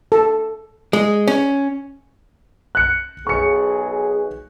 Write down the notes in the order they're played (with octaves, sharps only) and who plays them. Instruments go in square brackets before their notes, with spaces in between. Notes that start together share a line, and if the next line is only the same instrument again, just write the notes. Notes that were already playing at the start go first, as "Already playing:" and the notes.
[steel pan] A4
[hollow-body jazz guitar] G#3
C#4
[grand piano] F#6 C#7
[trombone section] B1 G#4 [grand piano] C#6 C#7